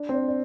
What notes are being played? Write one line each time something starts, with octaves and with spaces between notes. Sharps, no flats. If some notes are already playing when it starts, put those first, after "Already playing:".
Already playing: D4
C4
D4
D5